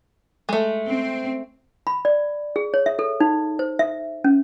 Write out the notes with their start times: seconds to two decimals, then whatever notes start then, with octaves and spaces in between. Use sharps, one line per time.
0.49 G#3 A3
0.86 C4
1.87 B5
2.05 D5
2.56 G#4
2.74 C#5
2.86 E5
2.99 A4
3.20 D#4
3.59 C5
3.79 E5
4.24 C#4